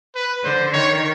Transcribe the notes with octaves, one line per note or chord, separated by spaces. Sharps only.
B4
D3 C5
D#3 C#5